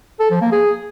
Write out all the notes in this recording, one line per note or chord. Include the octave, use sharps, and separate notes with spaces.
A4
F3
A#3
G#4